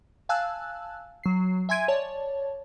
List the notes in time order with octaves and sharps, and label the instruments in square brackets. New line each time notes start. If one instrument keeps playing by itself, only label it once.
[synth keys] F5 G#5 A5 E6 F#6
F#3 C7
E5 G#5 C6 G#6 D7 D#7
C#5 D5 A5